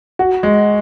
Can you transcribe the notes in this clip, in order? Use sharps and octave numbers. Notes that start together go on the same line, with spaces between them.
F#4
G#3